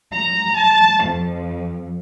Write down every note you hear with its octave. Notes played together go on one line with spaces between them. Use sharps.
A#5
A5
F2